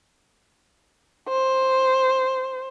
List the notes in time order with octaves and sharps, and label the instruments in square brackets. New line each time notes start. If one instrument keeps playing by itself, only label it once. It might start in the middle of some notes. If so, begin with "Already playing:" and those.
[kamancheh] C5